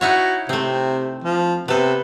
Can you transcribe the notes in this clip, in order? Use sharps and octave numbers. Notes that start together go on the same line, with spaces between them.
D#4 E4 F#4 C#5
C3 A3 C4
F3
C3 B3 A4